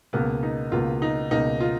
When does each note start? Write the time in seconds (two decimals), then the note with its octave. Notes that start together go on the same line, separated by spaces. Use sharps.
0.13 C#2 B2 A#3 B3
0.43 D#4
0.71 C#2 B2 A#3 F4
1.02 D#4
1.31 C#2 B2 A#3 D#4
1.61 F4